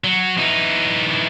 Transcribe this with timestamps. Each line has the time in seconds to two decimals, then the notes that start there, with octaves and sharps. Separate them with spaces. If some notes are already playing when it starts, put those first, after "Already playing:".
0.04 F#3
0.38 E3 D#4